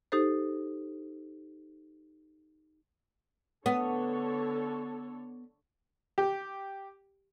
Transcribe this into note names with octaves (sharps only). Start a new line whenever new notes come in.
D#4 G4 A4 C5
D3 B3 A4 C#5
G4